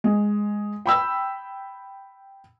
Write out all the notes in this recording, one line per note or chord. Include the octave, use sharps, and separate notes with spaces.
G#3
G5 B5 E6